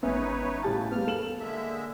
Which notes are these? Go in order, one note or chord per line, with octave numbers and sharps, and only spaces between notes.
G#1 B3 C#4 D#4 B4 C#5 E5
A2 G4 F5 A5 A6
G3 A#3 B3 F6
A4 E7 F#7
D3 G#3 A#3 E5